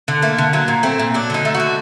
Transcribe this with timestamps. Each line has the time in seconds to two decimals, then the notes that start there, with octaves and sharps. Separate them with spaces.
0.08 D3
0.22 A3 A#3
0.38 D3
0.53 F#3 A#3
0.68 A#2
0.83 A3 C4
0.99 A#2
1.14 F#3 D4
1.30 D3 D#4
1.45 A3
1.55 F#4
1.60 D3